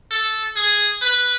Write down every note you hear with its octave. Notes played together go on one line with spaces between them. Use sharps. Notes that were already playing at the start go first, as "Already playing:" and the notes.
A4
G#4
B4